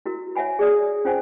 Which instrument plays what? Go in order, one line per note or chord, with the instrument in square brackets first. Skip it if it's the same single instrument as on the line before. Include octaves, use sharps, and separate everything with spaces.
[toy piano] E4 F#4 A#4
C#5 E5 F#5 G#5 B5
G#4 D5 D#6
C#4 F4 C5 F#5 G#5